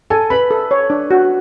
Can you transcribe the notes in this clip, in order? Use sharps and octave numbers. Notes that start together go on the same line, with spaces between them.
A4 G#5
B4 B5
A4
C#5
D4
F#4